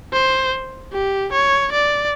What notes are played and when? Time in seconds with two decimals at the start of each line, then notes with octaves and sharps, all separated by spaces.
0.13 C5
0.93 G4
1.32 C#5
1.72 D5